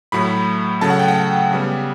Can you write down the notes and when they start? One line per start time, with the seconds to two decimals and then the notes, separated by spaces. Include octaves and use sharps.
0.12 A2 F#3 A3 B5
0.81 C#3 F#3 A3 A5
0.90 F#5
0.99 G5
1.08 F#5
1.51 C#3 G3 B3